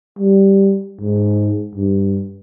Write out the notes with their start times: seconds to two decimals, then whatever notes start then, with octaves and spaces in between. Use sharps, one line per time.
0.19 G3
1.01 G#2
1.75 G2